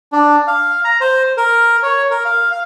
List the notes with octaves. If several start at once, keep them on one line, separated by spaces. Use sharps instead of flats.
D4
F5
A#5
C5
A#4
C#5
A#4
F5
F5